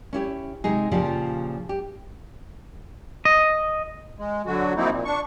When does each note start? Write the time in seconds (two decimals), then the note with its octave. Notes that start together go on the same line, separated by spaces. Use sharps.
0.13 C#4 E4 G4
0.64 C3 G#3 D#4 G#4
0.91 A#2 C#3 F3 F4 G4
1.69 G4
3.25 D#5
4.18 G#3
4.46 D3 F#3 F#4
4.76 F3 F#3 A#3 C4 D#4 E4
4.91 A#2
5.05 D4 C#6